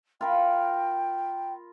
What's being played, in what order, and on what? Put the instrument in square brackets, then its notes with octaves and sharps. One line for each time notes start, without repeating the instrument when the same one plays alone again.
[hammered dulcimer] F4 A#4 B5 [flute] G5